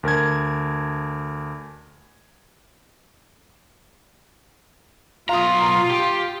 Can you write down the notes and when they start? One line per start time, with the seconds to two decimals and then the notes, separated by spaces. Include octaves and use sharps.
0.03 D2 A#4 A5 G#6
5.29 B1 F4 F5 A#5 C6 D#6
5.91 G4